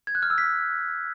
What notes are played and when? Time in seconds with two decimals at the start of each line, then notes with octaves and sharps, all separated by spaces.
0.07 G#6
0.15 F#6
0.23 F6
0.30 E6
0.38 B6